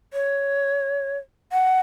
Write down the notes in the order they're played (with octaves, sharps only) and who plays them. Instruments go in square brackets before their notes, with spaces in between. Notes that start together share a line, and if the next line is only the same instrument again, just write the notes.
[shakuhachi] C#5
F#5